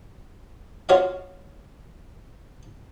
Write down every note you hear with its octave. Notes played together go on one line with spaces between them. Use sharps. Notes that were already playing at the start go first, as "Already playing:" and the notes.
F4 F#4 C#5 D#5 F5